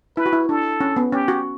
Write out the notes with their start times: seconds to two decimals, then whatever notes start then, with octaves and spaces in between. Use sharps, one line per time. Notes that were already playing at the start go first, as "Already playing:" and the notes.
0.17 E4 B4
0.26 F#4
0.33 E4
0.49 D4 A4
0.80 C#4
0.96 B3
1.12 C#4 G4
1.28 F#4